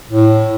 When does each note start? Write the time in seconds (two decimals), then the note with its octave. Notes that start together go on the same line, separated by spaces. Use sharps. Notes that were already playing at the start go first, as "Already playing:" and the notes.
0.09 A2